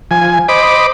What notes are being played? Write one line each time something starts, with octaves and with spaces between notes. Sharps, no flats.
F3 G#5
C5 D#5 B5 D6